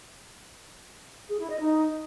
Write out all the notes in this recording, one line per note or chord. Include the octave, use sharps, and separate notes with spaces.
G#4
E4
D#5
D#4